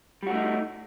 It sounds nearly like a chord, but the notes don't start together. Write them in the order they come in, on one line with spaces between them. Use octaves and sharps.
G3 F#4 A3 D#4